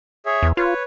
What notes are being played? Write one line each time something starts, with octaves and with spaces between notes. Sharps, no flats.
G#4 C#5 E5
E2
F4 B4 C#5